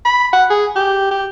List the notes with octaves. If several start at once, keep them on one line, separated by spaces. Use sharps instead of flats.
B5
F#5
G#4
G4
G4